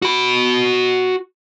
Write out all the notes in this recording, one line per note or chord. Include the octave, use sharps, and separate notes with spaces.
F#4 B5